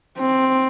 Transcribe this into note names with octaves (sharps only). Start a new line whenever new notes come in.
C4